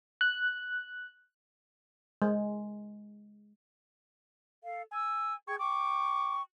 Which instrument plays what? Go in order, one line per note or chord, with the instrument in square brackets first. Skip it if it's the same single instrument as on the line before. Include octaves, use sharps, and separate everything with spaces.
[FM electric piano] F#6
[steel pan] G#3
[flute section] A4 F5
[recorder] G#5 [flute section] E6
[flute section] G#4 G5 G#6 [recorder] C#6
[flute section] G5 C#6 [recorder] D6